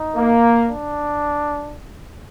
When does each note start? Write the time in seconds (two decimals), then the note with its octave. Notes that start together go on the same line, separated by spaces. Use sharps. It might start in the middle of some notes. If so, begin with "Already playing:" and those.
Already playing: D#4
0.16 A#3
0.68 D4